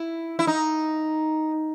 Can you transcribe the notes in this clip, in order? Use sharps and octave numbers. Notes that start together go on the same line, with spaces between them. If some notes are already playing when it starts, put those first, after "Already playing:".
Already playing: E4
E4
D#4